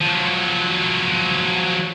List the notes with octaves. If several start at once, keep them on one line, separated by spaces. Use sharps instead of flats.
F3 F#3